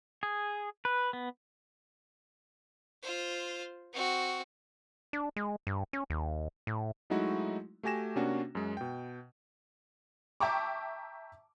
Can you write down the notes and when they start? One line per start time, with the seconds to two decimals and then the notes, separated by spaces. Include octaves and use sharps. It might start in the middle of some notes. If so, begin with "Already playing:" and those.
0.23 G#4
0.85 B4
1.13 B3
3.03 F4 C5
3.93 C4 F#4
5.13 D4
5.36 G#3
5.67 G2
5.93 C#4
6.10 D#2
6.67 A2
7.10 F#3 G#3 A3 D#4 E4 F#4
7.83 A3 F#4 G4 G#5 A#6 E7
8.16 C3 A#3 C#4 D4 F#4
8.55 F#2 G#3
8.77 B2 G5
10.40 E5 G5 A5 A#5 C#6 D6